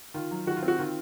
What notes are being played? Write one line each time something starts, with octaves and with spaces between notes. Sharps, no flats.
D#3 F4
F#3
D#3 F#4
F4
C4
F#4
D#3 F4